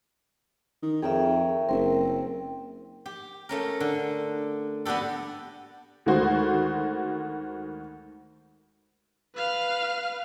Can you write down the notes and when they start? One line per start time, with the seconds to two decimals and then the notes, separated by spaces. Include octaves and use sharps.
0.82 D#3
1.02 F2 G#4 A#4 C#5 E5 G5
1.69 F#1 C4 A#4 E5
3.06 G4
3.49 A3 C#4 A#4
3.80 D3
4.85 B3 D4 F#4 G4 A4
6.06 D2 D#3 G#3 F#4 C5
9.35 B4 F5